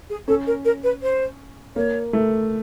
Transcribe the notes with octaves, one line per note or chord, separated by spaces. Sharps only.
G#4
C#4 A4
A#4
A#4
B4
C5
A#3 C#5
A3